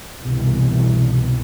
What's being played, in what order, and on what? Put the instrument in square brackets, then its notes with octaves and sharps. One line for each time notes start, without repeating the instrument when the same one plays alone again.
[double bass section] C2 G2 B2 D#3 E3